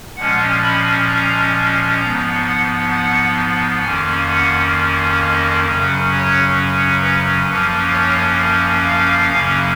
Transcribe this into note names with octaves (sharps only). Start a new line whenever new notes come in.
A#2 F3 G#3 C#4 F#5
B5
A#5
G#2 F3 B3 A#5
F#5
F#5
F2 D#3 A#3 C#4 G#5
F#5
D#5
F#2 C#3 F#3 C#4
C#5
B4
F#2 F3 A#3 C#4 B4
C#5
F5
F#2 C#3 F#3 A#3 C#4